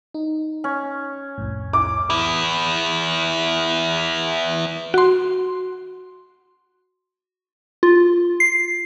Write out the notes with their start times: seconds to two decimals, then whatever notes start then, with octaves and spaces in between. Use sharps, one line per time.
0.14 D#4
0.64 C#4
1.38 C2 F2 A2
1.73 D6
2.10 B3 E4
4.94 F#4 C6
7.83 F4
8.40 C7